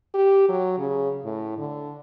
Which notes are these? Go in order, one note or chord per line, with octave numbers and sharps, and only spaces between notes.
G4
F#3
C#3
A2
D3